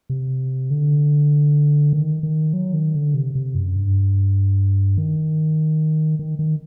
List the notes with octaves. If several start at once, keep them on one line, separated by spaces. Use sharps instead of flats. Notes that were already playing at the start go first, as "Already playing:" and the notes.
C3
D3
D#3
D#3
F#3
D#3
D3
C3
C3
F#2
G2
D#3
D#3
D#3